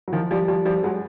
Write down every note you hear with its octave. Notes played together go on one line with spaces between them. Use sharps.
F#3
D#3 F3
F3 G3
F3 G3
F3 G3
F#3 G#3